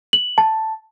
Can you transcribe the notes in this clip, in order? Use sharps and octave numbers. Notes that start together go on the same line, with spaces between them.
F#7
A5